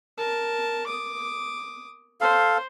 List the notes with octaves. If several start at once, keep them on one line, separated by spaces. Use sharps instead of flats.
A#4 A5
D6 D#6
A4 C5 F5